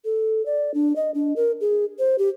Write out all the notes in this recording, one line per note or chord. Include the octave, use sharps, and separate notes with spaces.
A4
D5
D4
D#5
D4
A#4
G#4
C5
G4